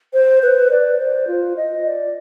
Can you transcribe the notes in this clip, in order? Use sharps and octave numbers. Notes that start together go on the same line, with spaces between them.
C5
B4
D5
C5
F4
D#5
D5